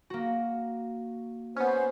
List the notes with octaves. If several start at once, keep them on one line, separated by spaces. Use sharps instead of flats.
A#3 F#4
B3 C#4 C5